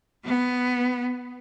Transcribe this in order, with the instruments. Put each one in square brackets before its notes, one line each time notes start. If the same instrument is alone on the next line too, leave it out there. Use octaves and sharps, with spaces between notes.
[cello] B3